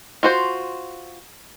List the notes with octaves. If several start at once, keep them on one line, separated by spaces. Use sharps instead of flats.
F4 F#4 C5